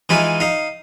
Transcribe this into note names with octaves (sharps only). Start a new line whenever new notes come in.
E3 G#3 D#4 F4
D#4 F5